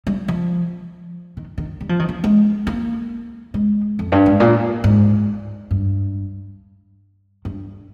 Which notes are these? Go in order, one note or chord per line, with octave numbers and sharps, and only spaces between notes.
G3
F3
D#3
D#3
G3
F3
D#3
F3
G#3
A#3
G#3
F2
G2
G#2
A#2
G#2
G2
G2